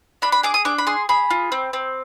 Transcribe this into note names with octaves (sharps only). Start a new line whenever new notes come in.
D4 B5
B5
G#4 D6
D#6
D4 D6
B5
G#4 C6
G#4 B5
F4
C4
C4